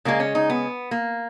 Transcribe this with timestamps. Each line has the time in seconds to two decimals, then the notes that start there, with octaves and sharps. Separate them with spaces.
0.05 C#3 G#3 A#3
0.20 C#4
0.35 D#4
0.50 B3
0.91 A#3